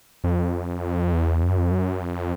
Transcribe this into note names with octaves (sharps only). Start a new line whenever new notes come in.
F2
E2
F2
F#2
F2
F#2
F2